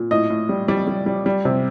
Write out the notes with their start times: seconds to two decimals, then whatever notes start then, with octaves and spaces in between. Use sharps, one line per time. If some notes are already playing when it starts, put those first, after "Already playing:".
Already playing: A#2
0.11 A2 D#5
0.30 A2
0.49 G3
0.68 G3 D5
0.87 G3
1.06 G3
1.26 G3
1.45 C3